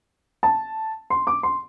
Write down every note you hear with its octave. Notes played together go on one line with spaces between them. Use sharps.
A5
C6
D6
C6